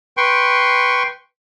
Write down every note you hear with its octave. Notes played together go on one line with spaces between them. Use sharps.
B4 G5 C6 C#6